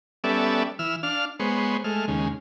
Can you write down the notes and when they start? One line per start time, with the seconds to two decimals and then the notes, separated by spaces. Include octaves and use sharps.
0.24 G3 B3 C#4 A4 D5 E5
0.79 E3 E6 F6
1.03 D4 F5 F6
1.40 G#3 B3 C5 C#5
1.84 G#3 A3 F6
2.08 D#2 C#3 G#3